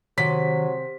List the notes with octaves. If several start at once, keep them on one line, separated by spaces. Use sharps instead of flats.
C3 D#3 F#3 B6